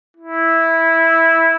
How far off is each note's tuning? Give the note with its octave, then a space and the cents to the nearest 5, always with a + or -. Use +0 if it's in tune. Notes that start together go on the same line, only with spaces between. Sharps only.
E4 -10